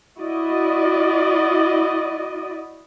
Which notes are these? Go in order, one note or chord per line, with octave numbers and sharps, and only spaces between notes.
E4 F#4 D5 D#5